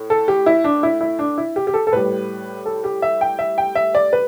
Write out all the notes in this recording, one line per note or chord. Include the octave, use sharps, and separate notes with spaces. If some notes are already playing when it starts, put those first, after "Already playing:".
Already playing: A2
A4
G4
E4
D4
E4
E4
D4
E4
G4
G4
A4
A4
A2 G3 B4
A4
G4
E5
G5
E5
G5
E5
D5
B4